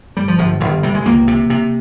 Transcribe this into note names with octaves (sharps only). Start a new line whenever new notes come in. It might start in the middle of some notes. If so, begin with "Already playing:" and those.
G1 G3
F3
G1 F3
G1 D#3
C3 G3
G#3
C#2 A#3
C3
C3